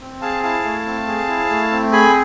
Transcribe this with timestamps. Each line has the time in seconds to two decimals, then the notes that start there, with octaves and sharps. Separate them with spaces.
0.01 C4
0.21 G#4 F5 A5
0.43 E4 F5 A5
0.64 A3
0.86 C4
1.07 G#4
1.28 E4
1.50 A3
1.71 C4
1.92 G#4 G#5 B5